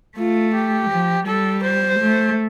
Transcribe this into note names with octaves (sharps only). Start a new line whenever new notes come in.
A3 F4
G4
F3
G3 A4
C5
A3